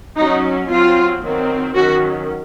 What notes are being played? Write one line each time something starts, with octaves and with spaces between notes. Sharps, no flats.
F#3 C#4 D#4
F#3 C4 F4
D#3 F#3 C4
D#3 F#3 C#4 F#4